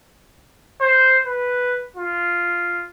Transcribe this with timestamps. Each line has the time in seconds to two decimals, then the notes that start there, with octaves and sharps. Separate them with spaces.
0.81 C5
1.27 B4
1.96 F4